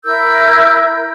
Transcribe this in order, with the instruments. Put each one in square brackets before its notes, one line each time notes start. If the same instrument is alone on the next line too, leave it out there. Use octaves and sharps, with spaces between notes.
[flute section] E4 A#4 E6 G6